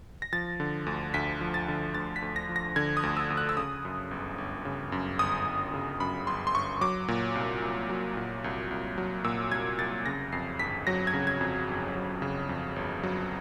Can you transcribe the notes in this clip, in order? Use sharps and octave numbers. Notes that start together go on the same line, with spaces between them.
A#6
F3 A6
D3
D2
D2 B6
F3
A6
D3
D2 A6
B6
D2
A#6
F3
A#6
D3 G#6
D#6
D2
E6
D2
F#6
E6
C#3 D#6
F#2
G1
G1
C#3
F#2
G1 D#6
G1
C#3
F#2 B5
G1 C6
C6
G1 C#6
F#3 D6
A#2
C2
C2
F#3
A#2
C2
C2
F#3
A#2 E6
C2 G#6
C2 A6
C#3 A#6
F2 C7
G1 B6
F#3 A#6
G#6
C#3
G#6
F2
G1
F#3
C#3
F2
G1
F#3